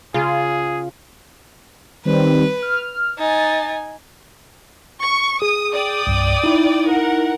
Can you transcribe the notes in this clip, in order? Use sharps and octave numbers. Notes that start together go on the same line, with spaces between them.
C#3 F4 G#4
D#3 G3 C4 B4
F6
D#4 G#5 A6
C#6
G#4 D#6
D5 G5 D#6
C2 G2
D#4 E4
A#4 F#5